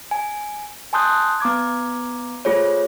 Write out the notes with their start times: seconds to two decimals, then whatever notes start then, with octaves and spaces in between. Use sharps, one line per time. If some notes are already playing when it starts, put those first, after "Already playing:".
0.11 G#5
0.93 G#5 A5 C6 D#6 F#6 G6
1.40 B3 A#5 D6 G#6
2.45 A3 F4 G#4 C5 C#5